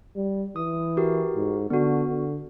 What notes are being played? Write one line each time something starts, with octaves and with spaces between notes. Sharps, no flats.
G3
E3 D#6
F#4 G4 A#4
G#2
D3 B3 F#4
D3